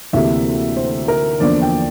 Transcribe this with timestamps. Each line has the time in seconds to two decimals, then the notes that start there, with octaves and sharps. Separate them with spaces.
0.13 D2 C3 E3 A#3 E5
0.77 C5
1.08 A#4
1.40 E2 D3 F3 A#3 D4 D5
1.62 G5